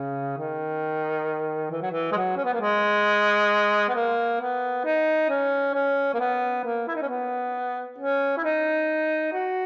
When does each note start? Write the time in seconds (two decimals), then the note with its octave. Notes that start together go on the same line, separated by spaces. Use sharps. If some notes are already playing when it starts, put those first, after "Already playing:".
Already playing: C#3
0.38 D#3
1.71 E3
1.82 F#3
1.91 E3
2.12 G#3
2.17 F#3
2.37 C#4
2.45 B3
2.54 A#3
2.61 G#3
3.89 B3
3.95 A#3
4.41 B3
4.85 D#4
5.29 C#4
5.75 C#4
6.14 A#3
6.19 B3
6.64 A#3
6.88 E4
6.96 D#4
7.02 C#4
7.09 B3
7.99 C#4
8.38 E4
8.44 D#4
9.33 F#4